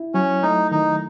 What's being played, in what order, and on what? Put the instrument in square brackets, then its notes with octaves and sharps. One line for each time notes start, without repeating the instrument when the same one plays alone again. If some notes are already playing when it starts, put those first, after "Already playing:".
Already playing: [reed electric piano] E4
[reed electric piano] F#3 [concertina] C#4
[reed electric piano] A3 [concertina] D#4
[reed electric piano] D#3 [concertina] D#4